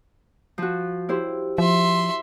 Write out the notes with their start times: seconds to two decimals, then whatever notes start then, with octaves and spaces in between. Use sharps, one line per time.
0.58 F3 F#4
1.09 E4 G4 C5
1.58 F3 E5 C6